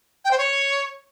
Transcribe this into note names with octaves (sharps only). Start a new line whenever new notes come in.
G5
C5
C#5